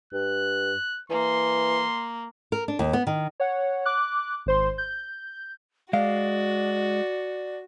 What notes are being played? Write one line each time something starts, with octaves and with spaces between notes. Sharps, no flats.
G2 F#6
E3 A#3 C6
A#4
D4
D#2
B3
D#3
C#5 F#5
D6 F#6
G#1 C5 C6
G6
G#3 F#4 D5 F5